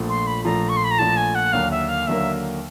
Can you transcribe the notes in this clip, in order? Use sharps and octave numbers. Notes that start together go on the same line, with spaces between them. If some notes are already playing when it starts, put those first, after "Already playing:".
Already playing: A#1 A#2 F3 A3
C6
B5
A#1 A#2 F3 A3 A#5
C#6
C6
B5
A#5
A#1 A#2 F3 A3 A5
G#5
F#5
D#2 D3 F#3 A#3 F5
E5
F5
D#2 D3 F#3 A#3 E5